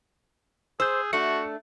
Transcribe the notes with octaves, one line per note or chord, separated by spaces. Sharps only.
G#4 C5 E6 G6
A3 D4 F#4 C#7